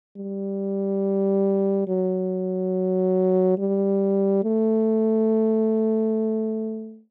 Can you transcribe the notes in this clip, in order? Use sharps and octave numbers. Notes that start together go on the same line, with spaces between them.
G3
F#3
G3
A3